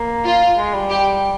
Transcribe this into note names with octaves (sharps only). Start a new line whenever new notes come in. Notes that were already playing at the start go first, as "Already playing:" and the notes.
Already playing: A#3
F4
G#3
G3
G4